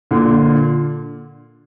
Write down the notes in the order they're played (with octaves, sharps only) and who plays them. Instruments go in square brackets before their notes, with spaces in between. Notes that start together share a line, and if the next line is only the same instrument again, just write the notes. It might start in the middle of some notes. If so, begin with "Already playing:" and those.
[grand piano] A#2 D3